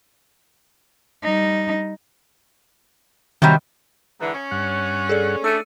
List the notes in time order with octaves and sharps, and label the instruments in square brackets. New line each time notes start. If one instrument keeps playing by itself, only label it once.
[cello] G3 D#4
[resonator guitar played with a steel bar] C3 F#3 G3 [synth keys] D#3
[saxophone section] G#2 D3 E3
C#4 C#5
[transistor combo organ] G2 F#5
[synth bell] G#4 A4 D5
[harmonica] A3 [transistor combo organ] D4 [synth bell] E6 C#7 D#7